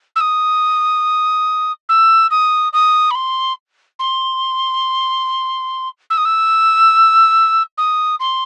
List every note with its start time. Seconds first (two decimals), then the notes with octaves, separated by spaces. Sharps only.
0.16 E6
0.21 D#6
1.89 E6
2.31 D#6
2.73 D#6
3.11 B5
3.15 C6
3.99 C6
6.10 E6
6.18 D#6
6.25 E6
7.78 D#6
8.20 C6